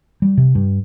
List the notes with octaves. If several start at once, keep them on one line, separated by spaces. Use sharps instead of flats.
G3
C3
G2